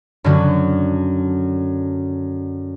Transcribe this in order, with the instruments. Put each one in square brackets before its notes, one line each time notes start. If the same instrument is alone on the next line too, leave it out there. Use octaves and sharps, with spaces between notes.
[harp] F#2 D3 F#3